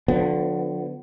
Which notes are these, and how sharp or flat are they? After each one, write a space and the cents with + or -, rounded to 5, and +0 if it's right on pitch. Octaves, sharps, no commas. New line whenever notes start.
D3 +0 F3 +40 B3 +30